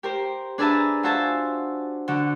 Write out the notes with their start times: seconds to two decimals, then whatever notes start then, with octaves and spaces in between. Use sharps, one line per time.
0.03 G4 A#4 C5
0.58 D4 G#4 B4 E5 A5 A#5
1.03 F4 F#4 C5 E5 G#5 A5
2.08 D3 F#4